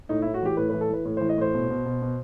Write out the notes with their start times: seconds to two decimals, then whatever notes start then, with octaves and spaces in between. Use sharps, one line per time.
0.09 A2 D#4
0.22 E4
0.26 A2
0.34 F#4
0.42 E3 G4
0.57 A2 B4
0.70 B4
0.74 E3
0.81 A4
0.89 E3 B4
1.05 A2
1.17 C5
1.21 E3
1.29 D#5
1.37 A2 C5
1.54 B2
1.70 B2
1.85 B2
2.02 B2